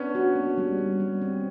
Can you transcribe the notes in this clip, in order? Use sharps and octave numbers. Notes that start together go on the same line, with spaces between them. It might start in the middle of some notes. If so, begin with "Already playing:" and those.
Already playing: B3 C#4 D4
F#4
A#3
G3
G3
G3
C4